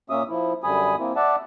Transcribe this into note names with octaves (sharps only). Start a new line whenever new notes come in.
A#2 A#3 C#4 E5 D#6
F3 E4
F#2 D3 G3 G#5 B5 D#6
A#3 C4 E4
D5 E5 F#5 A5